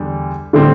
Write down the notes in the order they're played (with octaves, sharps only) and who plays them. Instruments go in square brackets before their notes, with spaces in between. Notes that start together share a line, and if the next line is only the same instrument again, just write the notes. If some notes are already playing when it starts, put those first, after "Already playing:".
Already playing: [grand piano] E2 D3 G3
[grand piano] A2 G3 C4 G4 [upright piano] D3